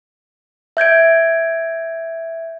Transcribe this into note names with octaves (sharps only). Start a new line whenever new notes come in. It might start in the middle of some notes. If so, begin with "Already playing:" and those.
E5 G6 G#6 D7